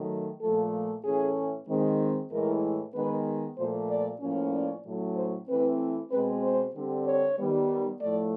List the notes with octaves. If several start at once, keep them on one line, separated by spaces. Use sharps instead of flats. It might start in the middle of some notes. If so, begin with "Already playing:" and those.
Already playing: D#3 F#3 A3
A#2 F3 A3 A4
A2 E3 A3 C#4 G#4
D#3 G#3 C4
A2 E3 G#3 A#4
D#3 G#3 B3 B4
A#2 F3 A3 C5
D5
A2 F3 A#3 C#4
D5
A2 F#3 A3 C#4
C5
E3 A3 C4 B4
B2 G#3 C4 B4
C5
D3 G3 C4
C#5
D#3 G3 B3
A2 F3 A3 D5